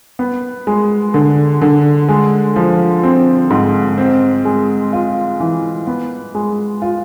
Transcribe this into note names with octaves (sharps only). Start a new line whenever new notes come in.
B3
G#3
D3
D3
G#3
F3
C4
G#2
C4
G#3
F4
E3
B3
G#3
F4